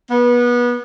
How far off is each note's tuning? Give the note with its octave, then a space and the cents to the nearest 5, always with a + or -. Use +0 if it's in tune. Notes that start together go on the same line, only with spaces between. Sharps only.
B3 -25